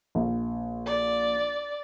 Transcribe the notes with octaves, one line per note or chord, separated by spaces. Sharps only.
A#1
D5